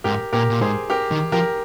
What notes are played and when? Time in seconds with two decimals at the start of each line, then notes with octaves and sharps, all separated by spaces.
0.04 G#2 G4 A#4
0.33 A#2 G4 A#4
0.50 A#2
0.61 G#2 G#4 C5
0.90 G4 A#4
1.11 D#3
1.32 F3 G4 A#4